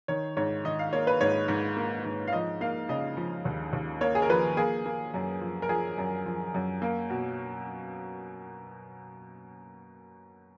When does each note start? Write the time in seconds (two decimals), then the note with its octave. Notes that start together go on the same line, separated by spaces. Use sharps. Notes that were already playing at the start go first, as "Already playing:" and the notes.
0.08 D#3 C#5
0.37 G#2 C#5
0.65 D#3 D#5
0.79 F5
0.93 A#3 C#5
1.07 B4
1.21 G#2 C#5
1.48 G#2
1.77 A#3
2.05 G#2
2.27 F5
2.33 F3 D#5
2.61 A#3 F5
2.89 C#3 D#5
3.17 F3
3.45 D#2
3.73 D#2
4.01 A#3 C#5
4.15 G#4
4.22 A#4
4.29 F3 B4
4.57 A#3 G#4
4.86 A#3
5.14 F#2
5.41 F3
5.62 A#4
5.69 F3 G#4
5.98 F#2
6.26 F3
6.54 F#2
6.82 A#3
7.10 B2